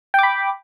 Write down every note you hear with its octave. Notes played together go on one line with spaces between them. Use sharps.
G5 B5 D6